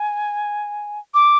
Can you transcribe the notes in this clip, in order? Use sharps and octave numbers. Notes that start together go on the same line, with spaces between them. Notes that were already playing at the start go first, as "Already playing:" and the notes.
Already playing: G#5
D6